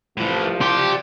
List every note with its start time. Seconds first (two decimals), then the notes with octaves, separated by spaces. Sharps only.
0.17 C2 A2 E3 F3
0.61 G4 D5 C6